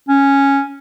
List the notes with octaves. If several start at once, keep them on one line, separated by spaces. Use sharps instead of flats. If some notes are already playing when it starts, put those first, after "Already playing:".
C#4